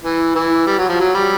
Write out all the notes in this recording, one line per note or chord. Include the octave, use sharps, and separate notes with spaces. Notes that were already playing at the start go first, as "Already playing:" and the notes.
E3
E3
G3
F#3
F3
F#3
G3